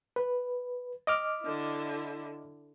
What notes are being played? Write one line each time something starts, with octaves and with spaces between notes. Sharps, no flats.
B4
D#5 D6 F6
D3 E4